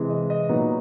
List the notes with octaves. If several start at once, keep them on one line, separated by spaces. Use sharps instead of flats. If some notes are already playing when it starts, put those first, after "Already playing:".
Already playing: C3 E3 G#3
D#5
D#5
A#2 F#3 B3 D#4